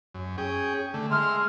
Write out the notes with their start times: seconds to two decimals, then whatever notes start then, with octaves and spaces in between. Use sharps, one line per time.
0.14 F#2
0.38 C#4 G#4 G5
0.94 D3 A3
1.11 G#3 E5 C6 F6